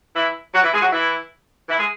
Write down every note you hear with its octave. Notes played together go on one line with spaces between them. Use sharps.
E3 E4
F#3 F#4
E3 E4
G#3 G#4
F#3 F#4
E3 E4
E3 E4
G#3 G#4